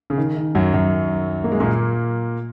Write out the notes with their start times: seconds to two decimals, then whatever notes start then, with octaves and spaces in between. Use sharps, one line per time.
0.10 C#3
0.18 D#3
0.36 D#3
0.55 F#2 F#3
0.73 F#2 F#3
1.44 A#3
1.52 G#3
1.60 A#2 A#3